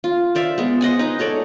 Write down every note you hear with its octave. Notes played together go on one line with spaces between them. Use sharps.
F4
C5 D5 E5 F5
G#3 B3
C5 D#5 F#5 G#5
D#4 B4
G#4 A4 C#5 D5